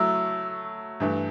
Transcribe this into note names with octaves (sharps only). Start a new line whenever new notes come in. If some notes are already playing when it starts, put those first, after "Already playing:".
Already playing: F#3 A3 E4 E6
G2 E3 A3